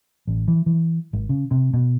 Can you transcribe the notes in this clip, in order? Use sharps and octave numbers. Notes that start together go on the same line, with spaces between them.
A1
E3
E3
G#1
C#3
C3
B2